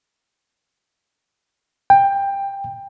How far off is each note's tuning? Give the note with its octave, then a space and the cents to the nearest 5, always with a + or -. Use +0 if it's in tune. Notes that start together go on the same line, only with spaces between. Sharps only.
G5 +15